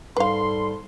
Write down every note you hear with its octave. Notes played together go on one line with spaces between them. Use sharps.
G#2 G3 A4 B4 F5 C6